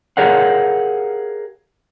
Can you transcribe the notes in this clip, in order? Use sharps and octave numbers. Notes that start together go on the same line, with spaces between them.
G4 G#4 A#4 C#5 F5 F#5